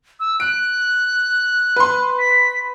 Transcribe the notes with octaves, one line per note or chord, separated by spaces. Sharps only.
E6
F#6 D7
B4 C6
B6